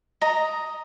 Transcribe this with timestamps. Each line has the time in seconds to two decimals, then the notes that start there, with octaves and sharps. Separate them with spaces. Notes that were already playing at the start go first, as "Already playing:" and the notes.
0.21 D#5 A#5